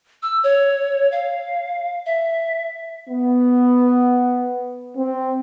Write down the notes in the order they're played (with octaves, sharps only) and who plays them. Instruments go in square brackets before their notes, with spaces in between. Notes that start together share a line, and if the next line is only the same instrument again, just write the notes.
[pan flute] E6
C#5
F5
E5
[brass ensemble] B3
C4